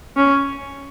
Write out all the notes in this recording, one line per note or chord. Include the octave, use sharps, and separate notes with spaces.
C#4